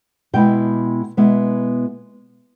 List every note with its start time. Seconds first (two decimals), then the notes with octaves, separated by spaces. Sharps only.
0.34 B2 G#3 B3 E4 G5
1.17 B2 G#3 B3 E4